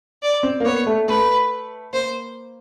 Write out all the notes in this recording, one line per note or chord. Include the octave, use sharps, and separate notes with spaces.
D5
C4
A#3
B3 C#5
A3
A3 B4
A#3 C5